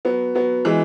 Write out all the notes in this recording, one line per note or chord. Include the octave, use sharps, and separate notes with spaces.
F#3 B3
F#3 B3
E3 G#3